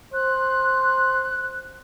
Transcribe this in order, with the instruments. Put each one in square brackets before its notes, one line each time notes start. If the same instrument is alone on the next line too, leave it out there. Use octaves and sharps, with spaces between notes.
[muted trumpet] C5 [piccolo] F#6